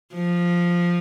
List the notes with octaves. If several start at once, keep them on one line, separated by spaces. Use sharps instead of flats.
F3